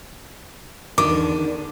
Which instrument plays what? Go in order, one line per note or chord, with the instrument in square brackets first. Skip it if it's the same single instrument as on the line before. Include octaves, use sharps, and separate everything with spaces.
[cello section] E2 D3 D4 [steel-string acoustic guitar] D#3 [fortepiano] D6